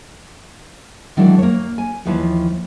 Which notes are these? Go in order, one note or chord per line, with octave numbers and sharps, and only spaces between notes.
D#3 E3 F#3 G#3 D4
A#3 C#5
G#5
D#2 E3 F3 B4 C#5 A5